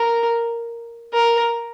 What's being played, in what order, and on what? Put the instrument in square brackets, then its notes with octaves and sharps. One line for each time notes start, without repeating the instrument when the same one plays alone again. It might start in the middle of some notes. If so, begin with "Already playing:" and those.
Already playing: [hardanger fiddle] A#4
A#4